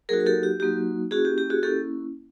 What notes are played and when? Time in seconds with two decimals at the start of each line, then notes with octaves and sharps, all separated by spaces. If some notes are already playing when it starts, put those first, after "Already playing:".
0.09 F#3 A#3 D#4 F#4 G#4 A#4
0.20 A#4
0.26 G4 A4
0.43 G4
0.60 F#3 A#3 D#4 F#4 G4
1.11 A#3 C#4 E4 F#4 G#4
1.25 G4
1.38 G4
1.50 F#4 G#4
1.63 A#3 C#4 E4 G4 A4